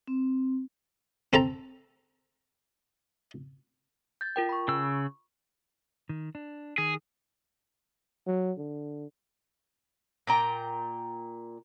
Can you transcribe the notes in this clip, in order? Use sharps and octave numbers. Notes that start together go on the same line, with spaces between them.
C4
C4 A4 A5 A#5
G6 A6
F4 A#4 G5
B5 C#6
C#3 E6
D#3
D4
D#3 G#4
F#3
D3
A#2 G5 A#5